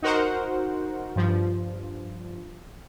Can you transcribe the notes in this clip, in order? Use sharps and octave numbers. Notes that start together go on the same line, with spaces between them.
D#4 F#4 A#4 C5 F#5
G2 F3